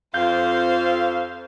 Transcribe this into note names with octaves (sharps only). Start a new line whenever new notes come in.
F2 C5 F5 G6